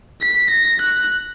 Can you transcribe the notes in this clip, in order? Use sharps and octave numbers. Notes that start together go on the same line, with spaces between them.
B6
A#6
F#6